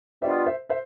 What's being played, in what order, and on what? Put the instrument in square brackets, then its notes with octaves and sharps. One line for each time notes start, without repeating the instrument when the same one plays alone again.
[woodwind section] B2 G3 B3 D4 F4 [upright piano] C5 E5
[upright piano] C5 E5
C5 E5